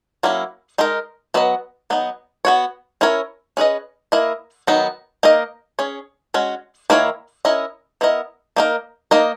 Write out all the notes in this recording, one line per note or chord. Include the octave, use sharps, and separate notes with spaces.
F#3 A#3 C#4 E4
G#3 D#4 A#4
F#3 B3 F#4 B4 D#5
F#3 B3 D#4
B3 F#4 C#5
C#4 E4 A#4 C#5
C#4 G#4 B4 D#5
A#3 E4 A#4 D#5
D#3 F#3 B3 D#4
A#3 D#4 A#4 D#5
C#4 G#4 C#5
G#3 C#4 F#4
D#3 A#3 E4 A#4 C#5
C#4 E4 A#4 D#5
B3 E4 A#4 D#5
A#3 D#4 A#4
A#3 D#4 A#4 D#5